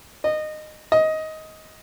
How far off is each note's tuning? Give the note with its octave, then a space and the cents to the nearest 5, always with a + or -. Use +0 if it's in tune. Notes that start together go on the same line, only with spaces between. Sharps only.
D#5 -20
D#5 +15